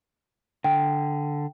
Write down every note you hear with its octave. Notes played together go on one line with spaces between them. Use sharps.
D3 G5